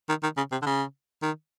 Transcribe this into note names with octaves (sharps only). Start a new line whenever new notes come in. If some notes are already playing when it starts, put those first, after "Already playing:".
D#3
D#3
C#3
C3
D3
C#3
D#3